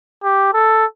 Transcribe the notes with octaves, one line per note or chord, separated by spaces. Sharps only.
G4
A4